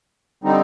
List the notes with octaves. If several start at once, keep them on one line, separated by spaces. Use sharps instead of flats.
D3 G3 C4 D#4